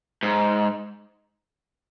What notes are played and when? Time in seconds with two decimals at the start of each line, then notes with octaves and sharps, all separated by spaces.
0.23 G#2